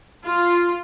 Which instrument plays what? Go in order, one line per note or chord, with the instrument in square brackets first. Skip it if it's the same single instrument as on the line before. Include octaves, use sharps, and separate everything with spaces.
[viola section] F4